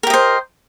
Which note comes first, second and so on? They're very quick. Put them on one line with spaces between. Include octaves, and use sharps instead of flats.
A#4 G4 D#5 C5